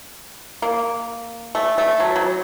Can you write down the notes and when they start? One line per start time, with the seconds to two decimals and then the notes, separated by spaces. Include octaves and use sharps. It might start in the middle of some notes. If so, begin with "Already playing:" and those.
0.62 A#3
1.55 A3
1.78 A3
2.00 F#3
2.16 F#3